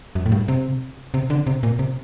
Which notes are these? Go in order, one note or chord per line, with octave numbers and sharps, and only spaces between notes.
F#2
A2
G2
C3
C3
D3
C3
A#2
C3